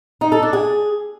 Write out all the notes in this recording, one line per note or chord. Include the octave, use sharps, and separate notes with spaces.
D#4
A4
D4
G#4